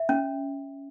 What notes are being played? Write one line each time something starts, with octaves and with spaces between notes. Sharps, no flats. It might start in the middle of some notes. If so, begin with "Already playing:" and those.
Already playing: E5
C#4